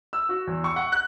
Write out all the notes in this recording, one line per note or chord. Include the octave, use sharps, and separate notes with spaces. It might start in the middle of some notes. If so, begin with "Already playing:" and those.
E6
F#4
E2
C#6
F#5
F#6